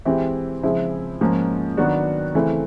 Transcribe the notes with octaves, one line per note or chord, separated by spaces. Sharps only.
E3 G#3 C4 E4 G4
C#3 F3 G#3 C4 E4
G#2 F3 A#3 C#4
D#3 F#3 B3 D4 F#4
C#3 E3 A3 C4 E4